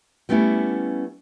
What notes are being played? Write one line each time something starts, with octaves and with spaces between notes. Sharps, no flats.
G3 A3 B3 C#4 E4